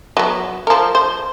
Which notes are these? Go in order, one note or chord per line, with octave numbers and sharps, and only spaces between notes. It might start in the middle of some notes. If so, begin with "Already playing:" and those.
F#3 B3
F3 A#4
C5